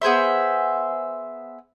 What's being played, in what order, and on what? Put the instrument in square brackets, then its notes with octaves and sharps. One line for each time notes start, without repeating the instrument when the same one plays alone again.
[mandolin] B3 G#4 C5 E5